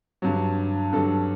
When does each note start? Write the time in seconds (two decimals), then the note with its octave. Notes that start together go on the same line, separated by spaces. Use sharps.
0.22 G2 D3 F#3
0.93 G2 D3 F#3 A4